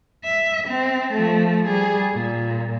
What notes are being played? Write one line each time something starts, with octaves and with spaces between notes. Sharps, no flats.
E5
C4
F3 A3
G3 G#4
A#2